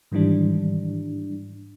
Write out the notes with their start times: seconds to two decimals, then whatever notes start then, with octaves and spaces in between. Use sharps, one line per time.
0.12 G#2 D#3 E3 G3 D4